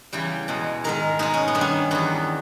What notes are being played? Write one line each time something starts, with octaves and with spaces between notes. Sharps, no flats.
E2 C#3 E3 G3 G5
E2 B2 G#3
G#2 D#3 G#3 A#4
B2 G#3 D#4
C#4
B3
G2 D#3 G3
C#4
E2 D#3 G3 B3